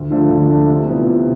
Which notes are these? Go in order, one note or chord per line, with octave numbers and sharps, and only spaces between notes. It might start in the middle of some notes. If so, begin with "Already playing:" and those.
Already playing: D2
D3 F3 A3 D4
D2
D3 F3 A3 D4
C3
E3 B3 F4
C3